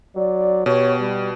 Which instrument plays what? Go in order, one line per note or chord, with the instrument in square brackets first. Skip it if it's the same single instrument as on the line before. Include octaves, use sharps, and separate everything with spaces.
[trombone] F#3 [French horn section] D5
[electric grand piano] B2 [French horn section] B3 F#4 G4 [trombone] C#5
[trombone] G3